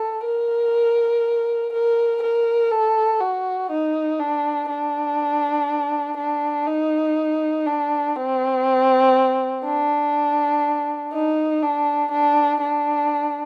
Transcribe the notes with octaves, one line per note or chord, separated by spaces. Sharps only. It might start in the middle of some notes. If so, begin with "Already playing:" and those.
Already playing: A4
A#4
A#4
A#4
A4
F#4
D#4
D4
D4
D4
D#4
D4
C4
D4
D#4
D4
D4
D4